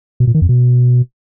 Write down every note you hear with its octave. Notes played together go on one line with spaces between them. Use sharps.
B2
A#2
D#3
F2
B2